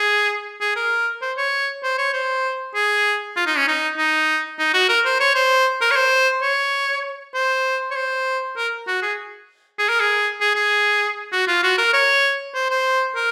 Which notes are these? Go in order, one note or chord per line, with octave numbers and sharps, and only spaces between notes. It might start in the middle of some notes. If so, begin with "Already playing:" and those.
Already playing: G#4
G#4
A#4
C5
C#5
C5
C#5
C5
G#4
F4
D#4
C#4
D#4
D#4
D#4
F#4
A#4
C5
C#5
C5
A#4
C#5
C5
C#5
C5
C#5
C5
A#4
F#4
G#4
G#4
A#4
G#4
G#4
G#4
F#4
F4
F#4
A#4
C#5
C5
C5
A#4